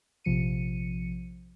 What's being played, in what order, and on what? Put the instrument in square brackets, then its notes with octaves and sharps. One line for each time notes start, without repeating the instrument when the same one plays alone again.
[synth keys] A#1 C3 F3 C#7 D#7